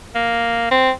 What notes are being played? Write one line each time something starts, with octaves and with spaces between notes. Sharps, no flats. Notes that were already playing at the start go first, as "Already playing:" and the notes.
A#3
C4